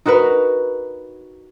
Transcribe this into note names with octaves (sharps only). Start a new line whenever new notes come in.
D#4 F#4 A#4 B4